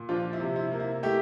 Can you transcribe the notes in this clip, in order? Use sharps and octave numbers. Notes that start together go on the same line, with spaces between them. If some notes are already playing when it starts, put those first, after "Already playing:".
Already playing: A#2
F3 D4 F4
E4
C3
E4
A#3
E4
A3 E4 G4